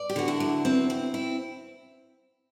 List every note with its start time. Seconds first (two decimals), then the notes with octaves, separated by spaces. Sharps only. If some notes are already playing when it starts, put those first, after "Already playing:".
Already playing: D5
0.09 G4
0.16 D3 F#4
0.28 E4
0.40 F#3
0.65 C4
0.90 C4
1.14 E4